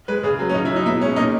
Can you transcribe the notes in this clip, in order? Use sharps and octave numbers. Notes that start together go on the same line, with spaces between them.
G#3 B4
C#3 G#4
F#3
C#4
C#3 D#4
E4
F#3
D#4
B2 E4
G#3 C#4
A#2 D#4